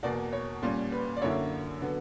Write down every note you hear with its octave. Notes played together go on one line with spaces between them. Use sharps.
E2 B2 A#3 D5
C#5
A#2 G3 C#4
B4
D5
F#2 D3 A#3 E4 C#5
D3 F#3 B3